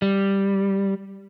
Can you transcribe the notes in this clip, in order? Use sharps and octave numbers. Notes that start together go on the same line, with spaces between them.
G3